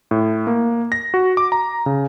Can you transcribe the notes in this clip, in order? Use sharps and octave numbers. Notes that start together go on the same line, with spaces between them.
A2
A#3
A#6
F#4
D6
A#5
C#3